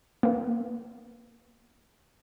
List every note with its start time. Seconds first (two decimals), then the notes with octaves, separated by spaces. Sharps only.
0.23 A#3 B3